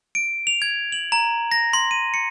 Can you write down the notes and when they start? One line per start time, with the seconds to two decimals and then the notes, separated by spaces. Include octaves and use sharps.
0.15 D7
0.47 F7
0.62 G#6
0.92 F#7
1.12 A#5
1.52 A#6
1.73 C6
1.91 D#7
2.14 C#7